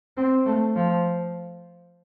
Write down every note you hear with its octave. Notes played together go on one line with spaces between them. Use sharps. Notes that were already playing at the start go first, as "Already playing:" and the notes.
C4
A3
F3